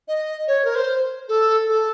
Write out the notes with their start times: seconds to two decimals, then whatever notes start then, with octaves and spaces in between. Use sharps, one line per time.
0.08 D#5
0.48 C#5
0.65 A#4
0.75 C5
1.29 A4
1.69 A4